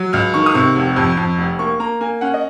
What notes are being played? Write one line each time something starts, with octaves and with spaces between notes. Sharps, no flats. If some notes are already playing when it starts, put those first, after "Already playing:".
Already playing: F#3
C#2 F6
D#3 C#6
D#6
C3 C#6
F1
F2
F2
F1
A#3 C#6
A#3 A#5
A#3 G#5
C#4 F#5
D#5